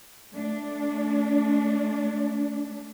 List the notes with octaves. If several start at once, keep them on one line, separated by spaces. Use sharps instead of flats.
A3 D4